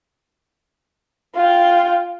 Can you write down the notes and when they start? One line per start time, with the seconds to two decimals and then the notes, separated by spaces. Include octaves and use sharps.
1.35 F4 G5